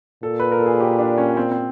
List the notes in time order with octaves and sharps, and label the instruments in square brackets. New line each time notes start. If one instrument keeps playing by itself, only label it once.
[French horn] A#2 [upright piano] A4
[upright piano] B4
A#4
A4
G#4
G4
D4
C#4
C4
C4